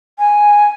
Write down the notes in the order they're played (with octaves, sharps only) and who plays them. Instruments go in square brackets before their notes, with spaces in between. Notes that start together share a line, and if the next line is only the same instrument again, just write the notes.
[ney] G#5